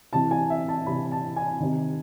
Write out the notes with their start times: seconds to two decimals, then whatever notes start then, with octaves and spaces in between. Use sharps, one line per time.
0.13 C3 E3 A5
0.31 G#5
0.50 E5
0.68 A5
0.86 C3 E3 B5
1.12 A5
1.36 G#5
1.60 C3 D#3